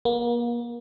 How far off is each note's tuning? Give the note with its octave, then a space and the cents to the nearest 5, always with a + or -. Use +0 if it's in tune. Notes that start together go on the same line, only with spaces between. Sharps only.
A#3 +35